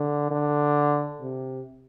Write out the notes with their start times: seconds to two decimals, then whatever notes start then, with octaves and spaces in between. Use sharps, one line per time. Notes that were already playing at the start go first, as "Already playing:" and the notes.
Already playing: D3
0.31 D3
1.22 C3